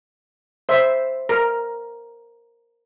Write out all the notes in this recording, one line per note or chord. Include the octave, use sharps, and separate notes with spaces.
C5 E5
A#4